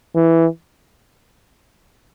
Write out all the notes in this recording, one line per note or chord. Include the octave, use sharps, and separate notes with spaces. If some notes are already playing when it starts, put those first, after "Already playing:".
E3